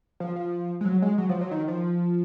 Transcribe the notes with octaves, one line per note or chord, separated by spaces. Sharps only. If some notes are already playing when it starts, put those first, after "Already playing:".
F3
F3
G#3
F#3
G#3
F#3
F3
F#3
D#3
F3